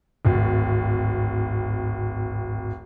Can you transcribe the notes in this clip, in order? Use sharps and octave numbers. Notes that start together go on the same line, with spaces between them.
D1 G#1